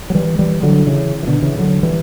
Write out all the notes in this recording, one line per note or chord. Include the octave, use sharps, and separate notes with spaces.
F#3
E3 G3
E3 G3
D3 F#3
C#3 E3
E3
B2 D3
C#3 E3
D3 F#3
E3 G3